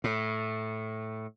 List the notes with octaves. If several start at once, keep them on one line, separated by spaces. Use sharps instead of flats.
A2